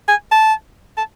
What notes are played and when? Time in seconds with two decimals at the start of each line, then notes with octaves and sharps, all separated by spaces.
0.08 G#5
0.32 A5
0.98 A5